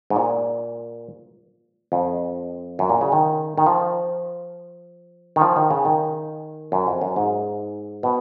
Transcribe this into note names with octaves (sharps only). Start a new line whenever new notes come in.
G#2
A#2
F2
F#2
A#2
C#3
D#3
D#3
F3
D#3
F3
D#3
C#3
D#3
F#2
F2
F#2
G#2
B2